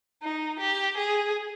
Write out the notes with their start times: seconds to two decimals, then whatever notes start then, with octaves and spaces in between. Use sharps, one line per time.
0.23 D#4
0.59 G4
0.97 G#4